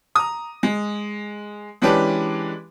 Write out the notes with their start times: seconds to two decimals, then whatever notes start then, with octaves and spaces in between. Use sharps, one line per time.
0.15 A#5 D#6
0.63 G#3
1.82 E3 G#3 C#4 D4 G4 B4